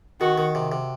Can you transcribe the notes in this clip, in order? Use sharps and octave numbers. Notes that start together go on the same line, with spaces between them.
D#3 F#4
D#3
C3
C3